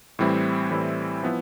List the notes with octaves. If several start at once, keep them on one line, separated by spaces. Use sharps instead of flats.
A2 E3 G3 C4 E4
A2 E3 G3 C4 E4
F3 B3 E4